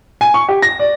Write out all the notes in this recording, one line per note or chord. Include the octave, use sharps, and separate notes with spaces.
G#5
C#6
G4
A#6
D5